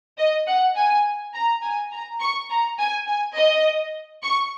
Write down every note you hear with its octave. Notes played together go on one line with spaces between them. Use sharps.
D#5
F#5
G#5
A#5
G#5
A#5
C#6
A#5
G#5
G#5
D#5
C#6